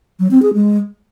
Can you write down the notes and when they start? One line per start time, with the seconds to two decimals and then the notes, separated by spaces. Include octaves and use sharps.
0.19 F#3
0.31 C4
0.42 G#4
0.54 G#3